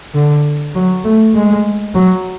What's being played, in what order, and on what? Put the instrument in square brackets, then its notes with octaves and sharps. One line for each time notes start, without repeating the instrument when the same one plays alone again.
[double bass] D3
F#3
A3
G#3
F#3